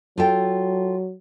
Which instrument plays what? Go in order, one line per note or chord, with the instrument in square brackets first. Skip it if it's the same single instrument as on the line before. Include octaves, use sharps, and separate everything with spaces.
[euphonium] F#3 [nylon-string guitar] F4 A4 G5